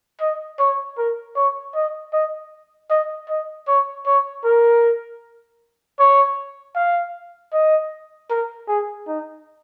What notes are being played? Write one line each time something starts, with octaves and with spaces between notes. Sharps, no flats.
D#5
C#5
A#4
C#5
D#5
D#5
D#5
D#5
C#5
C#5
A#4
C#5
F5
D#5
A#4
G#4
D#4